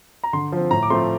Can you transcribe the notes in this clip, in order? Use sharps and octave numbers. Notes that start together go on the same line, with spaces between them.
A#5
D3 C6
F3 C4
A2 A#5
D6
F3 A3 C4 C6